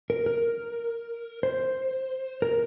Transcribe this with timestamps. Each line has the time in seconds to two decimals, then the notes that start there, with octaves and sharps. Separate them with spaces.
0.10 A#4
0.26 A#4
1.43 C5
2.42 A#4